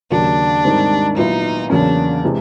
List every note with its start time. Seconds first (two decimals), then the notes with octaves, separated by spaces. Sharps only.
0.11 D#2 C#3 F#3 A#3 D4
0.64 G#2 D#3 G3 C4
1.17 A#2 F#3 B3 D#4 E4
1.70 E2 C#3 F#3 A#3 C#4 D4
2.24 C3 E3 G#3